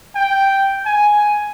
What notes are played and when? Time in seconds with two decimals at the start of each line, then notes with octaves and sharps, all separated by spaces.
0.15 G5
0.86 G#5